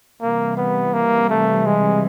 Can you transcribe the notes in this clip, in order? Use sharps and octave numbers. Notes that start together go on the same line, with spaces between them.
C3 E3 G3 A#3
B3
A#3
A3
G#3